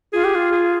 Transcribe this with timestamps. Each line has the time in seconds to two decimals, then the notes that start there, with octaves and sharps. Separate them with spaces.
0.13 F4 G#4
0.24 G4
0.35 F4
0.52 G#4